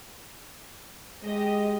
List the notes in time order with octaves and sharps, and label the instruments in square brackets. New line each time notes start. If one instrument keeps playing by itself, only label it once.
[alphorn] G#3 [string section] G4 D#5